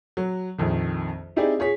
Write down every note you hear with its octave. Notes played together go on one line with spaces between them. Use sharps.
F#3
A#1 F2 D#3
C4 D#4 E4 G4 G#4 D5
F4 G#4 C#5 B6